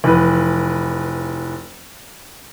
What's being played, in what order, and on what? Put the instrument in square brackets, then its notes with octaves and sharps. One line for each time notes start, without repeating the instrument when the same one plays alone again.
[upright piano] F1 E3 B4